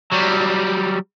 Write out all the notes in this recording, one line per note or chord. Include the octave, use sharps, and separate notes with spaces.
F#3 G3